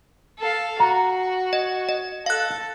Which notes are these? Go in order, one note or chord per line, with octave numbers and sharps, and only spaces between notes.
A4 F5
F#4 A#5
D#5
D#5
A4 F5 F#6